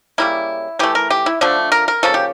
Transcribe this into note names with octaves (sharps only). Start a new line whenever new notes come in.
C#3 G3 A#3 E4
E3 A3 G4
A#4
G4
E4
D3 F3 A3 D4
A#4
A#4
C#3 F3 A#3 A4
G4